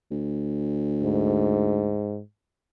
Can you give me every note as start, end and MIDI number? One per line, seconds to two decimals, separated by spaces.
0.11 1.96 38
1.03 2.20 44